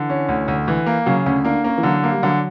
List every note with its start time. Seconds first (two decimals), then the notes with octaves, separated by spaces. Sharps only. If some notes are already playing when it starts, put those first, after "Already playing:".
Already playing: D3 E3
0.10 C#4
0.29 D2
0.48 D2
0.68 E3
0.86 A#3
1.06 C#3 F#3
1.26 D2 C#4
1.44 A#3 D4
1.64 A#3 C#4
1.78 E3
1.83 D3 F#3
2.04 A#3
2.12 G3
2.23 D3 F#3